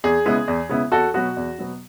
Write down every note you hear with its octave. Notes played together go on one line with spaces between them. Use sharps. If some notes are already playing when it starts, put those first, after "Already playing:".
E2 G#4
C#3 G#3 B3 E4
E2
C#3 G#3 B3 E4
E2 F#4 A4
B2 F#3 B3 F#4
E2
B2 F#3 B3